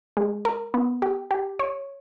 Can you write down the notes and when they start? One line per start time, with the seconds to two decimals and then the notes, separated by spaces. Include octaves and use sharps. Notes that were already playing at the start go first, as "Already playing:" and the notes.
0.17 G#3
0.45 A#4
0.74 B3
1.02 G4
1.31 G4
1.59 C#5